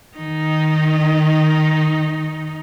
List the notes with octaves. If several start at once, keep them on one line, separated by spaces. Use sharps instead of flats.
D#3 D#4